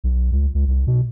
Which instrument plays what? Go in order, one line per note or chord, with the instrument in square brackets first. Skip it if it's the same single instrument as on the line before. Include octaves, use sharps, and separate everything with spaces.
[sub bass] B1
C#2
C#2
C2
B2